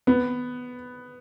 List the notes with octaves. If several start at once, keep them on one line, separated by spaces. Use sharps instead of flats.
B3